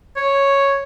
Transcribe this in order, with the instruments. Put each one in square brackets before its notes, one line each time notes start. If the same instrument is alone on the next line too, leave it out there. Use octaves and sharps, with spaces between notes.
[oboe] C#5